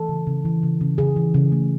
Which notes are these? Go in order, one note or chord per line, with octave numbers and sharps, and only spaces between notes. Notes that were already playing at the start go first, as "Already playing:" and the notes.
Already playing: E3 A4
C#3
C#3
E3
C#3
C#3
C#3 G#4
E3
C#3
A3